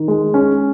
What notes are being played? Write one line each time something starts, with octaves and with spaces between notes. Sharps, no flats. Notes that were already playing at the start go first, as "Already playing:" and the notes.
Already playing: D#3
G#3
C#4